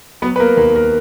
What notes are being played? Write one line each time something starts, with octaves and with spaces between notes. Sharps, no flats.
F#3 B3 B4
B4
A#3 A#4
D#2 A#3 A#4
A#3 A#4